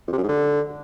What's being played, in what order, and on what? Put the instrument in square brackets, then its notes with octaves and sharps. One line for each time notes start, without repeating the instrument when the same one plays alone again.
[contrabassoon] F2
C3
F#2
G#2
D3